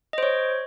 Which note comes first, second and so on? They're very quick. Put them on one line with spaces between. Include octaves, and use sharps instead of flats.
D#5 C5 C#5